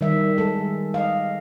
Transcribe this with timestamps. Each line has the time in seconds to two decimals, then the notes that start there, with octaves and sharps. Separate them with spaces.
0.01 D#3 G3 E5
0.38 G#3 A4
0.94 D#5 F5